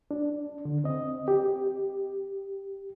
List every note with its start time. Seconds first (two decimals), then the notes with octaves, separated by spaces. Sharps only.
0.11 D4
0.65 D3
0.84 C4 D#5
1.28 G4